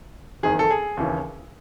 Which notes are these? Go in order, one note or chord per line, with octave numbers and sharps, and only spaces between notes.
F#1 E2 D#3 G#4
A4
G#4
D#2 C#3 E3